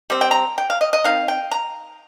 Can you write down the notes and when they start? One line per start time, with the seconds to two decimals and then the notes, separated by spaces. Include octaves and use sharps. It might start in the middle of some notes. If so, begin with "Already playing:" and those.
0.10 G3 C4
0.21 G5
0.31 A#5
0.58 G5
0.70 F5
0.81 D#5
0.93 D#5
1.04 D#3 C4 D#4 F5
1.28 G5
1.51 A#5